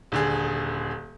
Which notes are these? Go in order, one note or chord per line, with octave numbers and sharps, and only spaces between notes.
D#1 D3 G#4